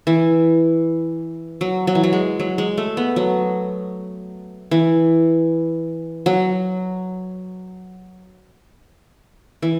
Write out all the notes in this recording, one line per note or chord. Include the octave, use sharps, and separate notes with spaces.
E3
F#3
F#3
E3
F#3
G#3
F#3
G#3
A3
B3
F#3
E3
F#3
E3